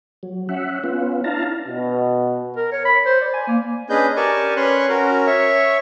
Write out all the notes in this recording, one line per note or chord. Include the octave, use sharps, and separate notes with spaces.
F#3
C#4 E5 F#5
B3 C#4 F4
D4 E4 F5 A5 A#5
B2
A#4
C#5
B5
C5
D5
G#5
A#3
C#4 D4 G#4 B4 D#5 G6
G4 A#4 D5 G#5 A5 C#6
C#4 B4 C#5 C6 C#6 F#6
C#4 F#4 A#4
C#5 E5 C#6